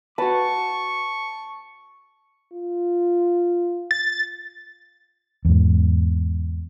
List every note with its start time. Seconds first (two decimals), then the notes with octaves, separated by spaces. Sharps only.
0.18 F#4 B4 A5 C#6
2.53 F4
3.91 A6
5.45 E2 G#2